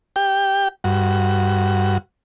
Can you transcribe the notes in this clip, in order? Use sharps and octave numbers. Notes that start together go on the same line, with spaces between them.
G4 G5
G2 F#4